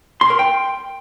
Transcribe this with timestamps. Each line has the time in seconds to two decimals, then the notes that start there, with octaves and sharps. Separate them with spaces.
0.21 C6
0.30 A#4
0.39 G5